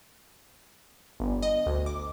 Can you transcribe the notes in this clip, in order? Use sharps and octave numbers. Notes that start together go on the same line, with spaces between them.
G1
D#5
D2
D6